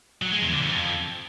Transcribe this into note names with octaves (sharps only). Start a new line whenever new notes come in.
F#3
G#3
E2
D3
F2